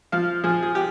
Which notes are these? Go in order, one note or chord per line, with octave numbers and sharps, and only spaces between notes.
F3 F5
F3 G#4
G#4
G4